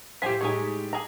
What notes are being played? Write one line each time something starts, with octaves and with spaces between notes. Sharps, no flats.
A2 F3 E4 G4 C5 G#5 B6
A2 G#3 D#4 C#5 G#5
G#4 A#5